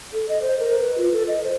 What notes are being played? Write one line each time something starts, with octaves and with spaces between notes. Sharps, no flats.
A4
D#5
C5
A#4
B4
F4
A4
D#5
C5